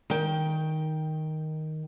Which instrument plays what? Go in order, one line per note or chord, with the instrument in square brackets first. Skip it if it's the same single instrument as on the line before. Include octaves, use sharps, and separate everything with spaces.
[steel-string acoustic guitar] D#3 G5